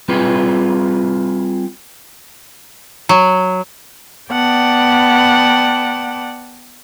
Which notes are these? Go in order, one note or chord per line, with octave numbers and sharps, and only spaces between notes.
G3 C4 F4 G#4 B4
F#3
B3 D5 F#5 G5 A5